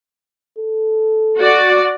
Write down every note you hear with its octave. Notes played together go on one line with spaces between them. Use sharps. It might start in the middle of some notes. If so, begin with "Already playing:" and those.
A4
F#4 D5